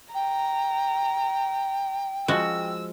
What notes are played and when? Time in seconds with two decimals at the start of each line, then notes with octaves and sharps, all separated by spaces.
0.14 G5 A#5
2.28 F3 G#3 F#4 E6